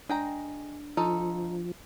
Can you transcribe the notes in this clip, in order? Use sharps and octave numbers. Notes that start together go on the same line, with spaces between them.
G#3 D4 G5 A#5
F3 D#4 F4 A4